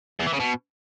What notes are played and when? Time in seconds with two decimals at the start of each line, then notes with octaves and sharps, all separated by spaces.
0.19 E2
0.26 E3
0.33 C#3
0.40 B2